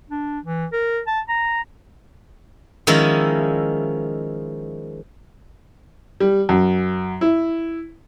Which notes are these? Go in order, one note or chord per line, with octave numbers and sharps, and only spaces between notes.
D4
E3
A#4
A5
A#5
D#3 F3 G#3 C#4 E4
G3
F#2
E4